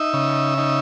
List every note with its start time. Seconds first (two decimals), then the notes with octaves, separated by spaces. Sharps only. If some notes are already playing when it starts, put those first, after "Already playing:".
Already playing: D#4 E5
0.14 C#3
0.58 D#4